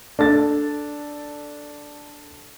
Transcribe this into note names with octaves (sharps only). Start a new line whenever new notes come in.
D4 A4 A6